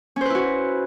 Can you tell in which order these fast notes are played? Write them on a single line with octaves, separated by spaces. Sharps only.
C#4 C5 B4 E4 F#4